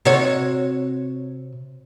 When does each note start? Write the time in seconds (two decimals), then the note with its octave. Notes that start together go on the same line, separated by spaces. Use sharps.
0.05 C3 F#4 C#5